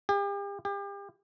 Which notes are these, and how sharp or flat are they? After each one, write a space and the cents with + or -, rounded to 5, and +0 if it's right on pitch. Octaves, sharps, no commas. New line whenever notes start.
G4 +40
G4 +35